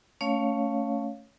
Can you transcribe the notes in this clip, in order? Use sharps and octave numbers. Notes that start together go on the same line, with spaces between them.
A3 C#4 C#5 F5